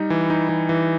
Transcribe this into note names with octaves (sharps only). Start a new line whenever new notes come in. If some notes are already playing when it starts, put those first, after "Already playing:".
Already playing: G3 D#4
E3
D#4
E3
E3